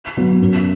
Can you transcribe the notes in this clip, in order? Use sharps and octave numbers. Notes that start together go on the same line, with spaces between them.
F#3 B3
F#2